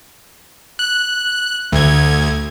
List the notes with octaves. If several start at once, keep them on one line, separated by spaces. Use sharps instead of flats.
F#6
D2 G#6